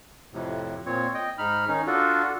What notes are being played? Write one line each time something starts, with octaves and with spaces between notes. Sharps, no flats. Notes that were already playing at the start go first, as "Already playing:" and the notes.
F2 A2 C3
A#2 C4 C#5
D#5 G5
G#2 D#4 B5 F6
D#3 C#4 D#4
D4 F4 F#4 A4